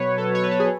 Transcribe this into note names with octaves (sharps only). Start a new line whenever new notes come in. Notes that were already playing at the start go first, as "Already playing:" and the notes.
Already playing: B2 F#3 B4 C#5
A4
C#5
B4
A4
G#4